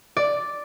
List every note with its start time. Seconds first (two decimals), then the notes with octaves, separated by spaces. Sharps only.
0.17 D5